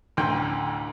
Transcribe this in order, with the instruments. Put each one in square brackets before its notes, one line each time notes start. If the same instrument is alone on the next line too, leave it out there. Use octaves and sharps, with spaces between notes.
[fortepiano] A1 D2 D3 G5 C6